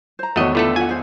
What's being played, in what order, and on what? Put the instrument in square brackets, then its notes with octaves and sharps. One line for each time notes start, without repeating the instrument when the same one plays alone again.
[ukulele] C5 A#5
[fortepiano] G#1 E2 [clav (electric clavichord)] A3 D#5 [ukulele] F#4 C#5
[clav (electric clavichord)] D3 A3 A4 [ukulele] E4 F4 B4
[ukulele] F4 F#5 [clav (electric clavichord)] G#5
[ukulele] G#4 C5